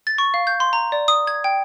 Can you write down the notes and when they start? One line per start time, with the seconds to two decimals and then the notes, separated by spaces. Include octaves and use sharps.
0.07 A6
0.18 C#6
0.34 F5
0.47 G6
0.60 C6
0.73 A#5
0.92 D5
1.08 D#6
1.27 G#6
1.44 G5